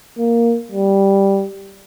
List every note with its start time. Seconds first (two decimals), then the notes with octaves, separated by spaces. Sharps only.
0.18 A#3
0.72 G3